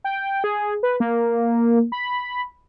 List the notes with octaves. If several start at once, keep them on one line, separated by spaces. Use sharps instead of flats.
G5
G#4
B4
A#3
B5